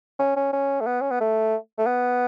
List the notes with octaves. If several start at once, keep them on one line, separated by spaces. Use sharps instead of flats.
C#4
C#4
C#4
A3
B3
C#4
B3
A3
A3
B3